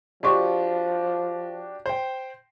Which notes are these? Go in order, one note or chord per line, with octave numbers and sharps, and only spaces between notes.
F3 D4 F#4 G4 D#5 C6 C#6
C5 G5